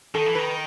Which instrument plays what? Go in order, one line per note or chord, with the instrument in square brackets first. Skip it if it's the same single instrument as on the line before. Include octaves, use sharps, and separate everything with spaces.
[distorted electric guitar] D#3 [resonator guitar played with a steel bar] A4
[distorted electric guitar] E3
[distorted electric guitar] D#3 [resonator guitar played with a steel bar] B4